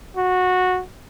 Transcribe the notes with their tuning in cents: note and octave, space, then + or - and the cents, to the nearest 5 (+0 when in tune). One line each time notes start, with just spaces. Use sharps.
F#4 -15